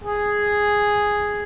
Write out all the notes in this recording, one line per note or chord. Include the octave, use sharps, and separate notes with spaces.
G#4